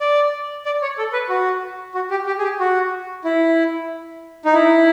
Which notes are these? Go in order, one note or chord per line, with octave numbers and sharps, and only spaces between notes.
D5
D5
C#5
A4
B4
F#4
F#4
G4
G4
G#4
G4
F#4
E4
D#4
E4